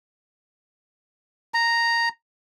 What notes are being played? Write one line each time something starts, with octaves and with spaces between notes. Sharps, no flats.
A#5